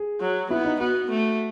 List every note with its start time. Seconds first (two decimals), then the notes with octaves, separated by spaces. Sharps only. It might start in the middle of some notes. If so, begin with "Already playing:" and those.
Already playing: G#4
0.20 F#3
0.50 B3 E4
0.65 D#4
0.79 B3 F#4
1.10 A3